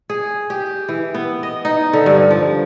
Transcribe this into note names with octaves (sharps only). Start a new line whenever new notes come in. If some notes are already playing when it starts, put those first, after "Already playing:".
G#4
G4
E3
B3
D#5
D#4
D3
G2
F3